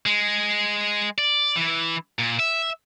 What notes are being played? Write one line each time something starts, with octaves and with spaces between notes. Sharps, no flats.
G#3
D5
E3
A#2
E5